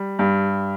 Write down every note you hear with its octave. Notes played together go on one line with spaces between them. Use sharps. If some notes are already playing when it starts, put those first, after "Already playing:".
Already playing: G3
G2